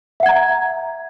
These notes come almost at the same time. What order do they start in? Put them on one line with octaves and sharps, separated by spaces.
E5 F#5 G#6 A#5